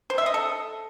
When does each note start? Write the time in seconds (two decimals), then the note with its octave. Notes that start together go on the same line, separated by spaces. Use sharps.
0.10 C5
0.18 E5
0.26 D#5
0.34 A4